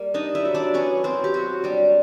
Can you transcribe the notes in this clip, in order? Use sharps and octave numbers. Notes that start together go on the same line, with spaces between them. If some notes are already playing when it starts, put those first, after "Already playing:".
Already playing: G3 A#3
D4 D#4 D#5
E4 E5
F#3
D4 D5
B3 C#4 C#5
F#3 C4 C5
G4
F#3 F#4
G3 D4 G4